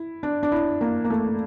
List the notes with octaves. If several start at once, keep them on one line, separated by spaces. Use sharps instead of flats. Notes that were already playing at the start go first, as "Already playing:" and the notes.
Already playing: E4
D4
D4
E4
A#3
A#3
A3